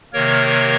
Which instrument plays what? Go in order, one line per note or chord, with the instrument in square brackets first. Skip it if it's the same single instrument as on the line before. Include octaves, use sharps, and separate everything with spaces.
[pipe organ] C3 D#3 A#3 A#4 C#5